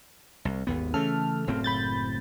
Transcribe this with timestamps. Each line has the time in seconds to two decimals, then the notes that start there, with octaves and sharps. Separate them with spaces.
0.45 C2
0.67 G#1 D#2 B3
0.94 C#3 E3 A3 A4 F6
1.47 F#1 A2 C4
1.64 B5 G6 A6